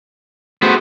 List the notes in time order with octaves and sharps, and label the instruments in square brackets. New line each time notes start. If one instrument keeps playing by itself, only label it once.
[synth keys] A3 F#4 G#4 [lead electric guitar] B3 C5